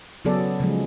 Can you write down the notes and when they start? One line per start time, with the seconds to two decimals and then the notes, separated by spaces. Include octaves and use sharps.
0.25 C#3 F#3 B3 G#4 A4 D5
0.60 C#3 F3 F#3 G#3 C#4